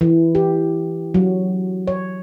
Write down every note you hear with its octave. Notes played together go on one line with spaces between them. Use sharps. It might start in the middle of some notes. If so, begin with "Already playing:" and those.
E3
G4
F#3
C#5